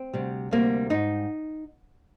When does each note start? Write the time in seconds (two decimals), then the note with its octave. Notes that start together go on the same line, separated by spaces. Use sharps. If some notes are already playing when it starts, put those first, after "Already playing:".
Already playing: C4
0.14 D2 C3 G3
0.51 D2 C3 G3 A#3
0.90 G#2 G3 D#4